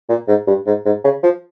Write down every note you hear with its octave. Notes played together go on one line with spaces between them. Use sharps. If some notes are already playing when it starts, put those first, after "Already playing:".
A#2
G#2
G2
G#2
G#2
C#3
F3